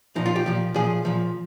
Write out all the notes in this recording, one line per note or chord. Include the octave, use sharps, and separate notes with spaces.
A#2 F3 D#4
F4
G4
A#2 F3
A#2 F3 G#4
A#2 F3